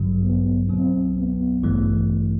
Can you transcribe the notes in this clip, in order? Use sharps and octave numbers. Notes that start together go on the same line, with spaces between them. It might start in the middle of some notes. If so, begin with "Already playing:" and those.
Already playing: A1 G2 D3 F#3
B3
C2 B2 F#3 C4
B3
A1 G2 E3 A3